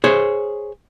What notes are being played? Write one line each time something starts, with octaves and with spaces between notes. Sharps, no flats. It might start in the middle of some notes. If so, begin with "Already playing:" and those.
G#4 C5 C#5